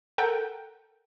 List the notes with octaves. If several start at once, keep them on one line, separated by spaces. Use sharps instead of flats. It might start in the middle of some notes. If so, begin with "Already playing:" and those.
A4 A#4 F#5 G5